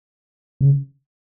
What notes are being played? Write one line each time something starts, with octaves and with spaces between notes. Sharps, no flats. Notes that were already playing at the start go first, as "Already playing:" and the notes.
C#3